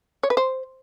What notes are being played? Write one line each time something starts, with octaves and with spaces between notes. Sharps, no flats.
C#5
B4
C5